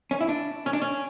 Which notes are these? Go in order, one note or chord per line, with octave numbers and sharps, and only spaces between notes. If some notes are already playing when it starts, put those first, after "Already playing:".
C#4
E4
D4
C#4
D4
C#4